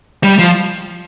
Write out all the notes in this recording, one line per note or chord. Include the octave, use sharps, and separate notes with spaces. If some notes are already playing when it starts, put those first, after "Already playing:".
G3
F3